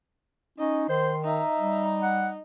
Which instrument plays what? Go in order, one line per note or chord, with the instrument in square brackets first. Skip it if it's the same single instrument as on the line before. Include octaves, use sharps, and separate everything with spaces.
[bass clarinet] C#4 [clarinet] D#4 [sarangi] D#5
[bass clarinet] D#3 [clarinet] C5 [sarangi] C6
[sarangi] D#4 [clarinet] E5 [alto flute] A#5
[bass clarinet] G3
[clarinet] F#5